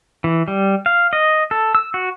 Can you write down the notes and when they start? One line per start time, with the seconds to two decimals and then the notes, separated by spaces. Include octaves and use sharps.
0.24 E3
0.48 G3
0.86 F5
1.13 D#5
1.51 A4
1.75 E6
1.94 F#4